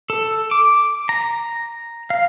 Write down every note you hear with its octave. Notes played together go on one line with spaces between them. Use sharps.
A4
D6
A#5
F5